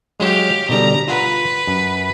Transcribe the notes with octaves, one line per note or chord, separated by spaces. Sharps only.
F#3 G#3 G4 F5
B2 D3 G3 A#5
F4 B4 F#5 A#5
F#2